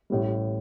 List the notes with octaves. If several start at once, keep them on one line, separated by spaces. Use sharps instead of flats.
A1 A2 G3